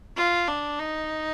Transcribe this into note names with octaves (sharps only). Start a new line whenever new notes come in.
F4
D4
D#4